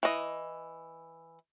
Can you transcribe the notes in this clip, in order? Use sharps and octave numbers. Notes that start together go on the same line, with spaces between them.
E3 D#5